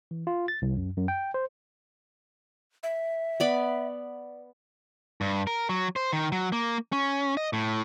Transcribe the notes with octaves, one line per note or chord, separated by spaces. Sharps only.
E3
F4
A6
C2
F#2
F#2
G5
C5
E5
B3 D5 B5
G2
A#4
F#3
C5
D#3
F#3
A#3
C#4
D#5
A2